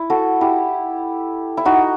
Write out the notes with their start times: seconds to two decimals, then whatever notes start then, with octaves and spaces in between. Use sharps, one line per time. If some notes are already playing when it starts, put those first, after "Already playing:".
Already playing: E4
0.10 F#4 A4
0.41 E4 G4
1.57 E4
1.65 D#4 F#4